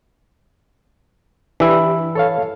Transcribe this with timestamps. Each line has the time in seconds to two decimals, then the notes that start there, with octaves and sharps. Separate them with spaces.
1.60 E3 D4 E4 G4 B4
2.15 A4 C#5 F5